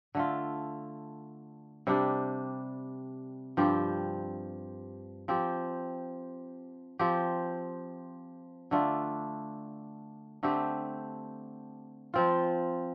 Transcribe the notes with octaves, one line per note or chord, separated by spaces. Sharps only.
D3 A3 F4
C3 G3 D4 G4
G2 F3 C4 G4
F3 C4 G4
F3 C4 G4
D3 A3 D4 F4
D3 A3 C4 G4
F3 C4 F4